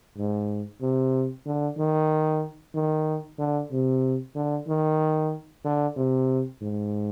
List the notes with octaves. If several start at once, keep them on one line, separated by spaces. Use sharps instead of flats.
G#2
C3
D3
D#3
D#3
D3
C3
D3
D#3
D3
C3
G#2